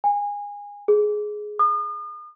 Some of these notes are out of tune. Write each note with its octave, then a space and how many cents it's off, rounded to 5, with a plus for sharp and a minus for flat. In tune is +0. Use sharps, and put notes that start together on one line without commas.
G#5 -25
G#4 +10
D#6 -40